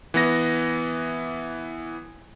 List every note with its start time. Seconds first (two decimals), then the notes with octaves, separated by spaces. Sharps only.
0.14 E3 B3 A#6